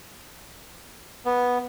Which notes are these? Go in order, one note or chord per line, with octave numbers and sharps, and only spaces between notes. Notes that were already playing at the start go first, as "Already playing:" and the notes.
B3